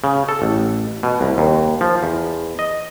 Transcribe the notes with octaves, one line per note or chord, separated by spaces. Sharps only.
C#3
A4
A1
B2
C2
D#2
F3
E2
D#5